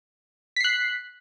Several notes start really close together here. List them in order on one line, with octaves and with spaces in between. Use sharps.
B6 C7 F#6